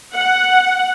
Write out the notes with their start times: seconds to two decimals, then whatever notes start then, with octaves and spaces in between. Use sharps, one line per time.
0.12 F#5